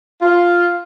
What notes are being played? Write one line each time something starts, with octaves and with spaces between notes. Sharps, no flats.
F4